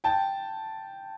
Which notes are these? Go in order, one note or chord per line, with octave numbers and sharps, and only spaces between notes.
G5 A5